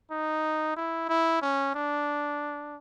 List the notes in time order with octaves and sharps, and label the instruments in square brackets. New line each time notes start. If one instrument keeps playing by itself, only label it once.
[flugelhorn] D#4
E4
E4
C#4
D4